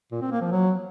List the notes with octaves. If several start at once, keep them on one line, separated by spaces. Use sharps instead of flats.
A#2
C4
A#3
F3
F#3